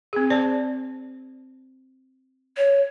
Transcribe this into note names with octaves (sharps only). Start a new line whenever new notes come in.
C4 G#4
C5 D5 A5
C#5